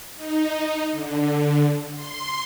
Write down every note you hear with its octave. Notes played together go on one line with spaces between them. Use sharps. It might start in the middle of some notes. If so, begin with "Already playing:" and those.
D#4
D3
C6